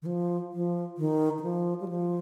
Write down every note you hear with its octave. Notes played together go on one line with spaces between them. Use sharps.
D#3
F3
F3
D#3
D#3
F3
G3
F3